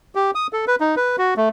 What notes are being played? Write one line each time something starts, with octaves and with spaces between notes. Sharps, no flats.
G4
D#6
A4
B4
D#4
B4
F#4
A3